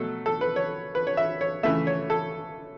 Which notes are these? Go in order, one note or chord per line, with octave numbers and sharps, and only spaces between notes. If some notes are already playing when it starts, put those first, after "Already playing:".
Already playing: B2 F#3 A3 A4
A4
B4
C#5
B4
C#5
E5
C#5
C#3 E3 A3 E5
C#5
A4